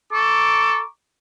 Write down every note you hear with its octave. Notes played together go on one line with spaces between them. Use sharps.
A4 A#5 C#6 D6